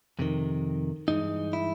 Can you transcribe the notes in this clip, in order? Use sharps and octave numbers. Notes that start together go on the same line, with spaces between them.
F2 C3 D#3
G2 E3 G#3 D#4
E4